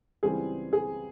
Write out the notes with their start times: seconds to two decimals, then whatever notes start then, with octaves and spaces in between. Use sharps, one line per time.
0.23 C#2 C#3 E3 G3 C4 G#4
0.73 G#4